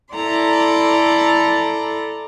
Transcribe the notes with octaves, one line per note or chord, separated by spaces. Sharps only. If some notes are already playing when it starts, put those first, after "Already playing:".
E4 A4 D5 A#5 C6